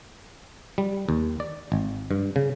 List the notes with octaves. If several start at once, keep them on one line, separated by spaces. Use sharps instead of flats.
G3
D#2
D5
G#1
G2
C#3